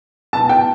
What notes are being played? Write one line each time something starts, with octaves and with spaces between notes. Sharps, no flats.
B2 A5
G5